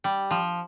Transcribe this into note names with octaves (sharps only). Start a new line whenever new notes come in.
G3
F3